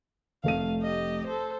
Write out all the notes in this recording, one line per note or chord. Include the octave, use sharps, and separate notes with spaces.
F1 A3 F5 D#7
G4 D#5
A4 C5